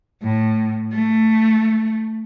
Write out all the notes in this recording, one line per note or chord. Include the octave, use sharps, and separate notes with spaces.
A2
A3